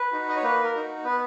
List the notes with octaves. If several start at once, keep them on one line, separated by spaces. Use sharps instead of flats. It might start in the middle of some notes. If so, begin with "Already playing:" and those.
Already playing: B4
D#4 F#4
D#5
C#5
A#3 B4
A#4
D#4 F#4
B3 B4